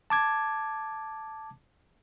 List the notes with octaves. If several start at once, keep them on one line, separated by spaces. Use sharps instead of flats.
A5 D6 G#6